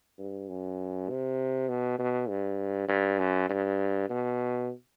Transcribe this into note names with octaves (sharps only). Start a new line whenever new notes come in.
G2
F#2
C3
B2
B2
G2
G2
F#2
G2
B2